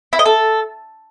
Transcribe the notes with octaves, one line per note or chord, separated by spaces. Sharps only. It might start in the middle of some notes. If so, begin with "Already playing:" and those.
E4
D#5
A4